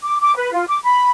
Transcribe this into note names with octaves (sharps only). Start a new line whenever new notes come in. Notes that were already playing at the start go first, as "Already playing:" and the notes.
D6
D6
B4
F4
D6
B5